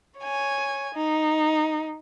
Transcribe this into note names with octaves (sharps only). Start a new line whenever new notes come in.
C#5 G#5
D#4